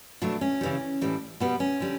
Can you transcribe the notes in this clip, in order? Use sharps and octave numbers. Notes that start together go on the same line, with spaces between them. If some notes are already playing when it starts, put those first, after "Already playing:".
B2 F#3 A3 D4
C#4
C#3 E3 G3
A2 E3 G3
B2 G3 B3
C#4
D3 G3